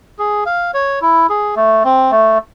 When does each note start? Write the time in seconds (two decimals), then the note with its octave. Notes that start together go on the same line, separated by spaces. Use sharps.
0.19 G#4
0.46 F5
0.74 C#5
1.01 E4
1.29 G#4
1.56 A3
1.84 C4
2.11 A3